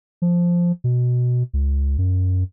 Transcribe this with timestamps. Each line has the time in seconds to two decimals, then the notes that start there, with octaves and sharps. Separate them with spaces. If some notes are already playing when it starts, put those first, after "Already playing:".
0.22 F3
0.84 B2
1.53 C#2
1.98 F#2